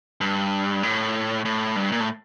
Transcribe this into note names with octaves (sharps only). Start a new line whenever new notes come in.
G2
A2
A2
G2
A#2
A2